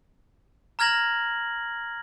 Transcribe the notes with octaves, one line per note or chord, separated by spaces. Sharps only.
A#5 F6 G#6 A#6 F#7